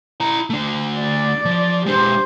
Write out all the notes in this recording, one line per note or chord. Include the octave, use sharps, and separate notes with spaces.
E4 A#5
A3 D4
D5
F3
G#3 D4 G4 C5